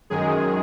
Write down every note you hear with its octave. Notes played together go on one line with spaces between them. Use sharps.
F#2 D#3 G#3 G#4